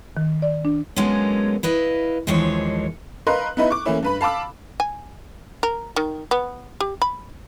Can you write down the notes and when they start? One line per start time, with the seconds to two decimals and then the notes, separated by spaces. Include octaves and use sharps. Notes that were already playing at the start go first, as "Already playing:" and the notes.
0.17 D#3
0.42 D5
0.65 D4
0.96 D3 F#3 G#3 A#3 B3 C#4
1.63 E4 B4 D#5 F5
2.27 D#2 E3 F3 G#3 D4 C#5
3.27 A#4 B4 D#5 F5 C6 F#6
3.57 B3 D#4 E4 B4 D#5
3.70 C#6 D6
3.85 E3 A3 A#3 C#4 E4
4.03 G2 B4 B5
4.21 F5 A5 B5 D6 E6
4.80 G#5
5.63 A#4
5.96 D#3
6.31 B3
6.80 G4
7.02 B5